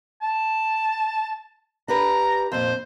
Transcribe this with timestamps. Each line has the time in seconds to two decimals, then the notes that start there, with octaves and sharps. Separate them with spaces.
0.22 A5
1.88 D4 G4 B4 A#5
2.52 F2 A#2 C5